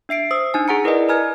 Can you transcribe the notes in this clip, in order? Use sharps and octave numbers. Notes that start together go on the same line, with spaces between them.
D4 E5 C7 D7
C5 D#6 E6
D4 D#4 G#5
G#4 F#5 A#5 C#7
E4 A#4 B4 D5 D#5
B4 G#5 A#5 F6 G#6